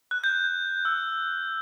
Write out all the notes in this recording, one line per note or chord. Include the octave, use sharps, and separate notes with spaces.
F#6
G6
E6